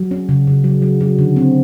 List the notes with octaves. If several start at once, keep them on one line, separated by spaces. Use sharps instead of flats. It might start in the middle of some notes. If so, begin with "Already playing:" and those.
Already playing: F#3
C#4
C#3
C#3
F#3
F#3
F#3
D3
C4